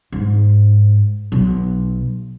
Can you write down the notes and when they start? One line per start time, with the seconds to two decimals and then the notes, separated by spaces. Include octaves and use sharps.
0.12 G#2
1.32 B1